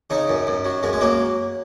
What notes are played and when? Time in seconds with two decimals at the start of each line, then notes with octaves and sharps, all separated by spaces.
0.10 C#3 D#4
0.29 F#2
0.47 F#2
0.65 F#3
0.83 F#2 G#3
0.93 G#3
1.01 F#3 A#3